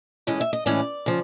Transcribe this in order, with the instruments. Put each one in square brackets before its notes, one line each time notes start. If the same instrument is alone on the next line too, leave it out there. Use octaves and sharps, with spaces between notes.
[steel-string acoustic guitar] A2 E3 G#3 C#4 D#5
E5
D#5
A2 E3 G#3 C#4 D5
C#3 F3